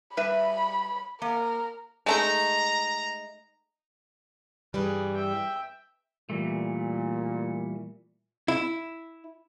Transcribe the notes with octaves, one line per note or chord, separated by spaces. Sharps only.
G3 B4 E5 B5
A#3 A#4
G#3 A3 D#4 A#5
G2 E3 G3 G#4 B4
E5 G5
A#2 E3 G3 A3
E4